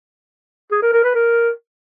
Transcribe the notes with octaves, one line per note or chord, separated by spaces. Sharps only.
G#4
A#4
A#4
B4
A#4